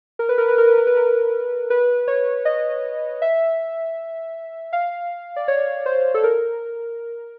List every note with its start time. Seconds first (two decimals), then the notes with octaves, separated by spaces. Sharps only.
0.19 A#4
0.29 B4
0.38 A#4
0.48 B4
0.58 A#4
0.68 B4
0.78 A#4
0.87 B4
0.97 A#4
1.70 B4
2.08 C#5
2.45 D#5
3.22 E5
4.73 F5
5.36 D5
5.48 C#5
5.86 C5
6.14 A4
6.24 A#4